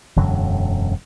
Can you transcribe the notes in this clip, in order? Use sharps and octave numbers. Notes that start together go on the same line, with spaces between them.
E1 F#2 D3 F#3